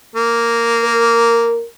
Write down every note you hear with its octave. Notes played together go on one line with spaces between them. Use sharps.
A#3
A#4